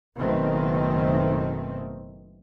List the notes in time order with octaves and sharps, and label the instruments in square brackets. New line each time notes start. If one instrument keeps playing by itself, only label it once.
[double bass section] F#1 B2 D#3 A3 C4